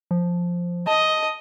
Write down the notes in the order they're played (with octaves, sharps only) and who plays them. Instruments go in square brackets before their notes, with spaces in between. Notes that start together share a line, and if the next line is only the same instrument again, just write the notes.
[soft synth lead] F3
[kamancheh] D#5 [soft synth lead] A5